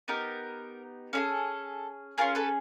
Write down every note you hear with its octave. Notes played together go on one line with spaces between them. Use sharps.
B3 D#4 G4 A#4
C#4 E4 G#4 A4
C#4 F4 G#4 A#4
A4 B4